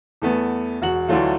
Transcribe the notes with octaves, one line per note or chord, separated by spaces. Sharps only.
E2 A3 B3
E1 F#4 F#7
D2 D3 E3 F#3 A3 F4